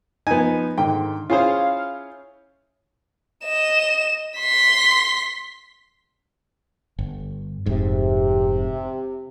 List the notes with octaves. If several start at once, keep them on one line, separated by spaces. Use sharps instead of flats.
F3 B3 D#4 G#5
G#2 D3 D#3 G5
C#4 E4 F4 G#4 C5 C#5 F5
D#5 E7
C6 B6
G1
F1 G#2 C3